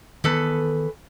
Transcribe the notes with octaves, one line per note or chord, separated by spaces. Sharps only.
E2 D#3 B3 A4 B4